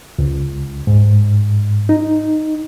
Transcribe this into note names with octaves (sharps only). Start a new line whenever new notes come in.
C#2
G#2
D#4